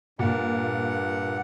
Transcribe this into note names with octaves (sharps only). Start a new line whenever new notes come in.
G2 A#2 F#5